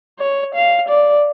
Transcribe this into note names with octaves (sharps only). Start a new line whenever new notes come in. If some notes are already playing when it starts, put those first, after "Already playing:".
C#5
F5
D5